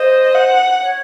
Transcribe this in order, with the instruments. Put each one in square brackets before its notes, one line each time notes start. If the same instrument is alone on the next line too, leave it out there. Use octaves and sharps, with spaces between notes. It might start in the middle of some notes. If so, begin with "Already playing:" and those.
Already playing: [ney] C5 [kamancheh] D#5
[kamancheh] F#5
[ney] C#5